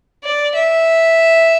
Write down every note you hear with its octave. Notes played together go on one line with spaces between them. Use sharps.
D5
E5